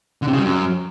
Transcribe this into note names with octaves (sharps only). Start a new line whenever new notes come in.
D3
C3
C#3
G3
F#2